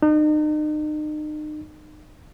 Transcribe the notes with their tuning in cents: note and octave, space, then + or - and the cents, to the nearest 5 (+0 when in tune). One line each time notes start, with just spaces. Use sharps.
D#4 -40